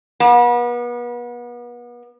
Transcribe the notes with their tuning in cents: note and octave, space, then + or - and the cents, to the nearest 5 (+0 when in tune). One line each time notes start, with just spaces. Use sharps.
B3 -35